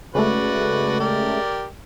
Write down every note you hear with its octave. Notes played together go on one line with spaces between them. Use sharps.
C#3 G#3 A3 F#4 B4 D5
G4 A#4 D5